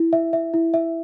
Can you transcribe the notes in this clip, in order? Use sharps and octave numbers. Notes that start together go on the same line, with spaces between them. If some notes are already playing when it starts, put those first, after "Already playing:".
Already playing: E4
E5
E5
E4
E5